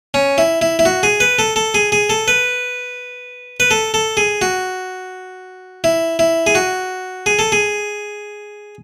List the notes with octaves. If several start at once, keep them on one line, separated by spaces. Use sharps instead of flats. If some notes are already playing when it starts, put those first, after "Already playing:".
C#4
E4
E4
E4
F#4
G#4
B4
A4
A4
G#4
G#4
A4
B4
B4
A4
A4
G#4
F#4
E4
E4
G#4
F#4
G#4
A4
G#4